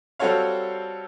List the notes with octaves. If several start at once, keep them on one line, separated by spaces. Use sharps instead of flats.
G3 C4 F#4 A4 C#5 F5